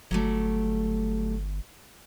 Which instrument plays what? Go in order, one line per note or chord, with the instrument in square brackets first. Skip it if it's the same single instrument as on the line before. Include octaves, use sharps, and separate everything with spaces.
[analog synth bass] G1 [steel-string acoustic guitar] F#3 G3 A3